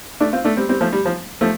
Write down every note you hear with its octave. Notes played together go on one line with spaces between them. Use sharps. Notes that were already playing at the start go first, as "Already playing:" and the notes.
A3 D4
C4 F4
A3 D4
G3 C4
G3 C4
F3 A3
G3
F3
F3 A3